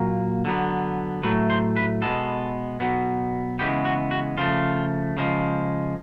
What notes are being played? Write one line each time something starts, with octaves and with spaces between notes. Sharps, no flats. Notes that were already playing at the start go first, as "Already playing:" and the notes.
Already playing: A#2 F#3 A#3
D3 F#3 B3
A2 F#3 A3 B4
C5
B4
B2 G#3 B3 A4
B2 F#3 B3
C#3 E3 G#3 B3 G4
F#4
F#4
C#3 F3 A3 F4
C#3 F3 G#3